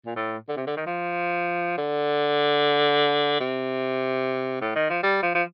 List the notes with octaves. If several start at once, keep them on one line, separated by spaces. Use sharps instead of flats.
A#2
A2
D3
C3
D3
D#3
F3
D3
C3
A2
D#3
F3
G3
F3
F3